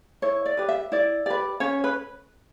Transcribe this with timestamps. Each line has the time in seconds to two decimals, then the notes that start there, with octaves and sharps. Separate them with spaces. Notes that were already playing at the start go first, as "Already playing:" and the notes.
0.22 E4 C#5
0.46 D5
0.57 G4 B4
0.69 E5
0.92 E4 D5
1.26 G4 B4 D5
1.60 C#4 C#5
1.84 B4